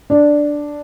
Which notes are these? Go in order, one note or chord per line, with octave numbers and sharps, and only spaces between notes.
D4